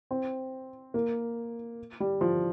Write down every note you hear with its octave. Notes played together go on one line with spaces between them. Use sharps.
C4
A#3
G3
F3